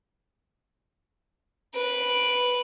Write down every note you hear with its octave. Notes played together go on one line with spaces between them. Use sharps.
B4 D7